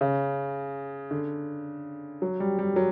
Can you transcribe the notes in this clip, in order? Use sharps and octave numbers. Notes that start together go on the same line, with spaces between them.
C#3
D3
F#3
G3
G3
F#3